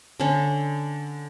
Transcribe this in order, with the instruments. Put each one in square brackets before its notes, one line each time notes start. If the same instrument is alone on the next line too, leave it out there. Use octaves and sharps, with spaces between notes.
[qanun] D3 C#4